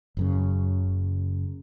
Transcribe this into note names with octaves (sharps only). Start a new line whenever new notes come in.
F#1 F#2 C#3